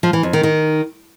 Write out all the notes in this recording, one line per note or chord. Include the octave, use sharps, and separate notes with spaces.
F3
E3
F2
D#3
D#3